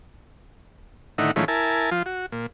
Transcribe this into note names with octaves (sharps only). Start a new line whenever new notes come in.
A2 D3 D#3 D#4 E4 F#5
G#2 D#3 F3 A3 C#4 E4
E4 A#4 G#5 A5
F3 F4
F#4
A#2